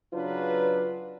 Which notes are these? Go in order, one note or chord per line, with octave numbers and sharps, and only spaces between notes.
C#3 F#3 D4 F4 B4